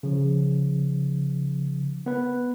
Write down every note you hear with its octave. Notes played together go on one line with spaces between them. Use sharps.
C#3 F3
B3 B4